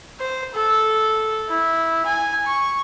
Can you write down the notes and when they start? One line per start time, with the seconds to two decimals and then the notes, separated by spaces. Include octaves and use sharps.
0.20 C5
0.54 A4
1.50 E4
2.06 G#5
2.46 C#6